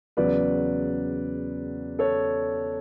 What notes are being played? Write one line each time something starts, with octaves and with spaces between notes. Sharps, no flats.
E2 C#3 F#3 B4 D5
A4 C#5